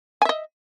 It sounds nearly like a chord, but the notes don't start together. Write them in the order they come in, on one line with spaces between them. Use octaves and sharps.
G#5 E5 D#5